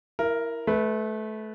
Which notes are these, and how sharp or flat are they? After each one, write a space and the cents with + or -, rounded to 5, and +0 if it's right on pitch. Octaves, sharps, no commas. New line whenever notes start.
E4 +0 A#4 +0 E5 +45
A3 -25 B4 +0